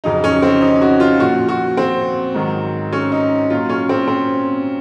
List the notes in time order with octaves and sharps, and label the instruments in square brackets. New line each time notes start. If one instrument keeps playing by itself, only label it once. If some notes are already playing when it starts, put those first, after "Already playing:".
[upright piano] F2 C#3 F#3 D#4
C#4
C4
D#4
F#4
F4
A#2 F3 F#4
F#4
C4
G#2 D#3 F#3
C#4
D#4
A#2 F#3 F4
C#4
C4
C4